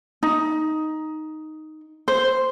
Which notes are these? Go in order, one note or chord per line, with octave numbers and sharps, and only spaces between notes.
D#4
C5